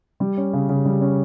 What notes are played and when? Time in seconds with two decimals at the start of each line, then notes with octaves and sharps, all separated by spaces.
0.20 G3
0.37 C#4
0.53 C#3
0.69 C#3
0.85 G3
1.01 C#4